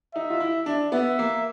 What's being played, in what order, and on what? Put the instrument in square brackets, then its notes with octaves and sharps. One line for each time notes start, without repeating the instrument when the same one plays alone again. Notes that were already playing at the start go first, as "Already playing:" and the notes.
[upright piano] D#4 [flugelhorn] E5
[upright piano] F4
E4
D4
[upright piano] B3 [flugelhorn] E5
[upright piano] A#3